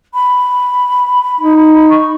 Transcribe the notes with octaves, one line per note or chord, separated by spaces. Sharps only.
B5
D#4
C#6